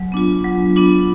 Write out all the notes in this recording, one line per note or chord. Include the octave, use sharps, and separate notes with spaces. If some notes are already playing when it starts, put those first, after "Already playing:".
Already playing: F#3
B3 D4 F4
F#3
B3 D4 F4